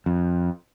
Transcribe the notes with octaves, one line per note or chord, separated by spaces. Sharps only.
F2